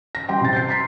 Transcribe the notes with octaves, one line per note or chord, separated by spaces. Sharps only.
A#6
G3 G5 C6
C3 A6
G6 A6 C7
A#5 C6 B6 C7